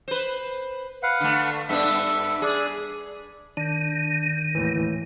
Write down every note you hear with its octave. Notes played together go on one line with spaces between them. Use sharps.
B4 C5
B4 F5 F#5
D3 A3
G2 B3 D4 A4 E5
D4 G#4
D#3 D4
D#2 A2 E3